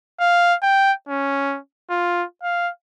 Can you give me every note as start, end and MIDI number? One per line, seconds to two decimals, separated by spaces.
0.20 0.55 77
0.63 0.92 79
1.09 1.58 61
1.90 2.24 65
2.43 2.70 77